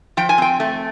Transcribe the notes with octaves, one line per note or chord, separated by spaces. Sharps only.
F3 G5
G#5
C4 G5
A3